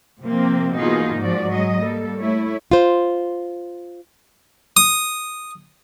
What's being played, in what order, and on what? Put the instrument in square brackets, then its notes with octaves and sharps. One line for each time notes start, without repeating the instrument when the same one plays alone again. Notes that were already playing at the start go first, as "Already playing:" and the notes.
[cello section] C3 F3 A#3 C4
B2 E3 A#3 D#4 F4 G#4
G#2 F3 F#4 D5
F#3 G#3 D#5
G3 A#3 A4
A3 E4 C#5
[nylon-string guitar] F4 C5
[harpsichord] D#6